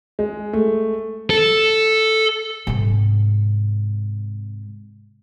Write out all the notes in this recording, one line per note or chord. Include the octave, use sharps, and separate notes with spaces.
G#3
A3
A4
G#2 C3